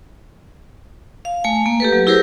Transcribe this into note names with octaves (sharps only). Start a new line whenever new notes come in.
F5
A3 G#5
A#3
G4 A4 B4
F#3
E4 G4 G#4 A#4 C5